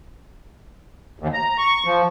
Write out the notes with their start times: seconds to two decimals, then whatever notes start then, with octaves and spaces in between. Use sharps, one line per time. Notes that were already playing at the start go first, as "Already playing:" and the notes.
1.20 D#2
1.33 A#5
1.58 C#6
1.85 F3